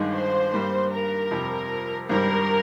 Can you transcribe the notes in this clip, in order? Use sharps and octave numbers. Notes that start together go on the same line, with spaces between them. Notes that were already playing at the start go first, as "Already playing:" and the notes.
Already playing: G1 G2 D#3 G#3 D#4
C5
G2 G3 A#3
A#4
F2 C3 G3
G#1 G2 G3 A#4